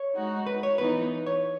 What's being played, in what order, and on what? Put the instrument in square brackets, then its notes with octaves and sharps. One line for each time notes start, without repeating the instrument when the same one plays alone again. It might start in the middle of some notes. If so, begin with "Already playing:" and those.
Already playing: [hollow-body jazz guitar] C#5
[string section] G#3 D#4 F#4
[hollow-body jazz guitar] B4
C#5
[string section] E3 B3 D#4 [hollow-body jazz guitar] B4
[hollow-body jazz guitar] C#5